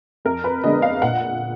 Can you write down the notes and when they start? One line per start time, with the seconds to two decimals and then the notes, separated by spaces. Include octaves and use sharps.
0.25 F2 A#4
0.44 B4
0.64 D3 G#3 B3 D4 D#5
0.82 F5
1.02 A#2 F#5